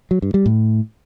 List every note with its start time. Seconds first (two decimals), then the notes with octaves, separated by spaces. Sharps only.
0.11 F#3
0.22 G2
0.34 G3
0.46 A2